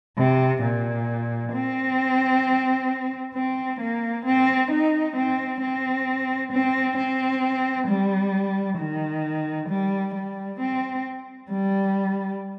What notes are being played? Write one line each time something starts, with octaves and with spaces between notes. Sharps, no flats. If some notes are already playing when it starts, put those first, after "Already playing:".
C3
A#2
C4
C4
A#3
C4
D#4
C4
C4
C4
C4
G3
D#3
G3
G3
C4
G3